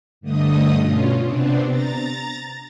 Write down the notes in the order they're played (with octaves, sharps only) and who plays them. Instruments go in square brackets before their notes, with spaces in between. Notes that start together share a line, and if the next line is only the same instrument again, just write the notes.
[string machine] G2 D3 A3 D#5 D#6
B2 C#4 F4
C3 B3 C4 D4
A#5 A6